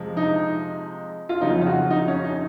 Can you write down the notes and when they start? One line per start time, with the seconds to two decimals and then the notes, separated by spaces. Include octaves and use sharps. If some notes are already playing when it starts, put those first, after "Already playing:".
Already playing: F2 C3 F3 G#3
0.17 D#4
1.29 F4
1.41 F2 C#3 F#3 D#4
1.61 F4
1.67 F#4
1.90 D#4
2.08 C#4
2.24 D#4